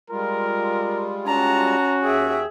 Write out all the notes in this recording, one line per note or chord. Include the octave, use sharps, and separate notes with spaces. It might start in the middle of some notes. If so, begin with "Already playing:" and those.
G3 G#3 F4 A#4
C#4 F#4 A5 A#5
D#2 G#4 E5 G5